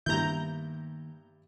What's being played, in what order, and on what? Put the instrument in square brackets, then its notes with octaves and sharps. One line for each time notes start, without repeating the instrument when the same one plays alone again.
[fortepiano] G2 E4 [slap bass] D#3 A#3 B3 [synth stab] A#5 G6